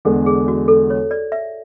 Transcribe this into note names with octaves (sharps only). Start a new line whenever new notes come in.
E2 D3 G#3 A4
G#4
F#4
A4
C#5
D5
E5